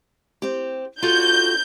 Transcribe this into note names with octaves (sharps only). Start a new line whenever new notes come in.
C4 G4
F4 F#4 A4 G6